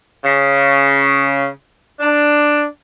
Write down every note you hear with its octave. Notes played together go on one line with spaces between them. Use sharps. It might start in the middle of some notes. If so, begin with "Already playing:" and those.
C#3
D4